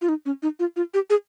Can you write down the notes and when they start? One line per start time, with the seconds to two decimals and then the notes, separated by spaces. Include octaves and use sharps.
0.01 F4
0.09 D#4
0.26 C#4
0.43 D#4
0.59 F4
0.76 F4
0.94 G4
1.10 G#4